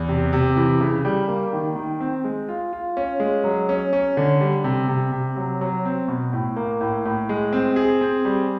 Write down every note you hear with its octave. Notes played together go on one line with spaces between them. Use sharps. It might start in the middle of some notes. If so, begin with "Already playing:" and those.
Already playing: E2
C3
C3
E3
C#3
G3
A#3
D#3
D#3
C4
G#3
F4
F4
C#4
G#3
F#3
C#4
C#4
D3
G3
C3
C3
C3
F#3
F#3
C4
B2
A2
A#3
A2
A2
G#3
C4
G#4
C4
G3